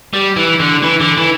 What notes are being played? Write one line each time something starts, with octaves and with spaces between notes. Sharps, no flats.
G3
E3
D3
E3
D3
E3